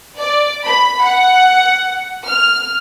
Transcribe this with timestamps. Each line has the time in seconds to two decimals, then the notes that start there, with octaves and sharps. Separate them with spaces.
0.19 D5
0.65 B5
1.03 F#5
2.27 F6